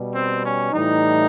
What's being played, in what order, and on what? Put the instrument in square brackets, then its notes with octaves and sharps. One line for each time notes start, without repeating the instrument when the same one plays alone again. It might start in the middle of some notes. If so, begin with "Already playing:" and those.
Already playing: [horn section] B2 G3
C4
C#4
A2 E3 G3 D#4